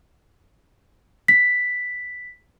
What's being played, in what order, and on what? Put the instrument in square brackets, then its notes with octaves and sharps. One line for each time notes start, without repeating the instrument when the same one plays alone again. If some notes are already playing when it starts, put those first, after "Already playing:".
[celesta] B6